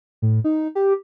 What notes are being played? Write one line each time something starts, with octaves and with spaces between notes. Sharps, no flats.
A2
D#4
G4